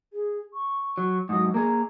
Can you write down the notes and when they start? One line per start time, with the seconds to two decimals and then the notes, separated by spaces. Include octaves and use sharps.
0.13 G#4
0.54 C#6
0.98 F#3
1.29 G#2 F#3 D#6
1.54 A#3 G#4 A#5